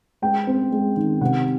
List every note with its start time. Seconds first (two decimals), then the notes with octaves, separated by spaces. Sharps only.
0.22 G#3 G5
0.47 C4
0.72 G#3
0.97 D#3
1.21 C3 F#5